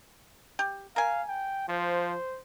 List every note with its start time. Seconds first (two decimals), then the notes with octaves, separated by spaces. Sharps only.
0.59 G4
0.96 A#4 F5 G#5
1.29 G5
1.69 F3 C5